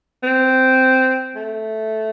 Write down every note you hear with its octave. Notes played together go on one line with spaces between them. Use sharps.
C4
A3